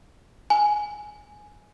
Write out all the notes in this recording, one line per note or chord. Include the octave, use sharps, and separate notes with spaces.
G#5